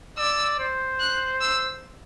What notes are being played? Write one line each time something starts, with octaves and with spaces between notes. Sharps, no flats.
D5 E6
C5
F#6
E6